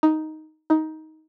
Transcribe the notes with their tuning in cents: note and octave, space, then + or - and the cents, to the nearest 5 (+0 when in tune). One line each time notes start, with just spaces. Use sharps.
D#4 +5
D#4 +15